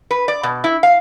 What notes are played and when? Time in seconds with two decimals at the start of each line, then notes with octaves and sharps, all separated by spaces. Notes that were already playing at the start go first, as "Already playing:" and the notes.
0.11 B4
0.28 D5
0.43 B2
0.64 E4
0.83 F5